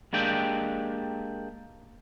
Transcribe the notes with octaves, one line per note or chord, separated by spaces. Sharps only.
G#3 A#3 D4 G4 G5